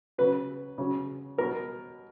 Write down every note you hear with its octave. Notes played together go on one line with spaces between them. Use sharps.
C#3 F#3 B4
C#3 F#3
B2 F#3 A#4